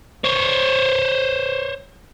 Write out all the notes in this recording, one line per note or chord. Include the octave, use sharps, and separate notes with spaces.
C5 C#5